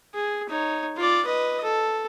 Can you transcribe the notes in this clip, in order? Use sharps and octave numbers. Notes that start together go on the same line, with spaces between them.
G#4
D#4 C#5
F4 D5
B4 D#5
A4